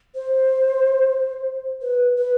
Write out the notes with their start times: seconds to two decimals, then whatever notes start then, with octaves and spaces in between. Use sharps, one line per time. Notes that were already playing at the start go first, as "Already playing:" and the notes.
0.15 C5
1.82 B4
2.18 B4